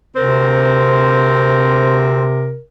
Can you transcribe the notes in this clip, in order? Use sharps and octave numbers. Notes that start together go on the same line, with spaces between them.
D2 C3 C4 A#4 C5